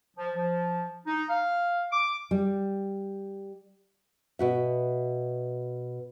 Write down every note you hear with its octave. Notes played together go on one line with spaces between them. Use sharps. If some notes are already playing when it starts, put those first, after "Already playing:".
F3
F3
D#4
F5
D6
G3
B2 F#4 E5